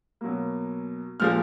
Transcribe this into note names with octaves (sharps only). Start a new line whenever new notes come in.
B2 F#3 A#3
A#2 F3 G#3 F6